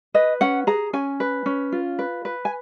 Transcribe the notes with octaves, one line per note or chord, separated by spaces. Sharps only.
B4 D#5
C#4 F#5
G#4 A#5
C#4 G#5
B4
C#4
F4
B4
B4
G#5